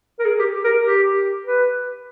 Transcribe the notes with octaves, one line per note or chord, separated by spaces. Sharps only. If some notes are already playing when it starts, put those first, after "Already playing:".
A#4
G#4
G4
A#4
G4
B4